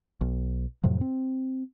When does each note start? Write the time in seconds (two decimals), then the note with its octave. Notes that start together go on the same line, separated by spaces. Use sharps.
0.21 B1
0.83 F2 A2 C3 F#3
1.01 C4